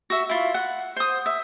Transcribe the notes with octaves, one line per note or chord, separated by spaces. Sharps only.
F#4 E5
E4 F4
F#5
C5 D#6
E5